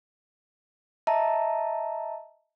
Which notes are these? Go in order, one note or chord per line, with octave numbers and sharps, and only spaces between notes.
D#5 E5 A5 A#5